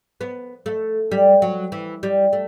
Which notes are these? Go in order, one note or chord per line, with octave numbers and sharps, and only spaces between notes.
B3
A3
G3
F#3
E3
G3
A3